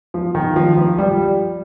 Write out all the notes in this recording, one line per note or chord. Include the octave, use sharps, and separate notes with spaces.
F3
D#3
F3
F3
G3